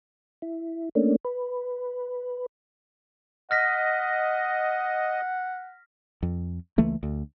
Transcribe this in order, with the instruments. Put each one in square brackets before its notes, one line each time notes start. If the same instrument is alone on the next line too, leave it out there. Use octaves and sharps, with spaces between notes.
[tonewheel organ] E4
A3 A#3 C#4 D4
B4
[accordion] D#5 [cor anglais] F#5 [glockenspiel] F6 A#6 B6
[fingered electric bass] F2
C#2 E3 A3 A#3
D2